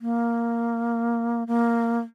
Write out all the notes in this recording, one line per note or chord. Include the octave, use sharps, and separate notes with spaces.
A#3
A#3